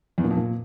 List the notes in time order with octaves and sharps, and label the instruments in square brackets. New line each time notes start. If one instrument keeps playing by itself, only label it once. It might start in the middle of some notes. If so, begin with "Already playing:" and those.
[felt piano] E2
A#2
F2
A#2